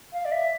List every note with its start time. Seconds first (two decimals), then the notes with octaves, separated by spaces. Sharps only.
0.12 F5
0.25 D5
0.31 E5